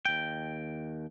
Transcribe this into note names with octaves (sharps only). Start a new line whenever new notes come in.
D#2 G5